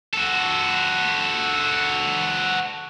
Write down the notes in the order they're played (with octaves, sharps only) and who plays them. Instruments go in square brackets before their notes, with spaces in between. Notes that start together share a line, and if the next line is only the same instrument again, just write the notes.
[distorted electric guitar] F#4 A4